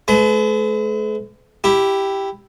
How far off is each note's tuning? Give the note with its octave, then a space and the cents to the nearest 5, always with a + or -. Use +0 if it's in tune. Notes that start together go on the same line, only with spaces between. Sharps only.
A3 -45 B4 +40
E4 +0 G4 +0